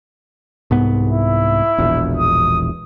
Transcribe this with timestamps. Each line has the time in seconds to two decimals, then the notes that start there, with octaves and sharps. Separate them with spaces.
0.71 C2 G#2 B3
1.10 E4
1.78 E1 A#1 E2
2.17 D#6